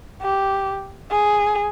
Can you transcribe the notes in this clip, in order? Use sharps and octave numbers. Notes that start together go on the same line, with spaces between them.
G4
G#4